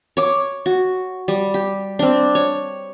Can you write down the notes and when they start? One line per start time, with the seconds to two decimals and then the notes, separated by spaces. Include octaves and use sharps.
0.17 C#5 D6
0.66 F#4
1.28 G3
1.54 G4
1.99 C4 D4
2.35 C#5